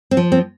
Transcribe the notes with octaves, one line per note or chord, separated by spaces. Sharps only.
C4
F3
C4